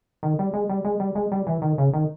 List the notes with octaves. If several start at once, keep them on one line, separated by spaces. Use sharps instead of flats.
D#3
G3
G#3
G3
G#3
G3
G#3
G3
E3
D#3
C#3
D#3